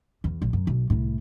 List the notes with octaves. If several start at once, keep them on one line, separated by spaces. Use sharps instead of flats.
E2
A#1
F#2
B1
C2 A2